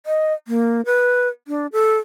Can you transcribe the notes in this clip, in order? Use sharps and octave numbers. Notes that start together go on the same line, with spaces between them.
D#5
A#3
B4
D4
A4